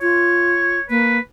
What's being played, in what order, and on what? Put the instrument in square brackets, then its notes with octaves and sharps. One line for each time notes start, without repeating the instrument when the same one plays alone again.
[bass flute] F4 [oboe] C#5
[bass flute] A#3 [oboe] B4